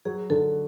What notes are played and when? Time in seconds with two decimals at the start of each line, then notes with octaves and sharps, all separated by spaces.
0.05 F#3 G#4
0.30 D3 A4